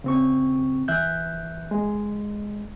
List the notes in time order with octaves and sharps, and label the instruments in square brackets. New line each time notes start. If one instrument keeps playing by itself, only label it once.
[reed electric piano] C#3 C4 C#6
E3 E5 F#6 G6
G#3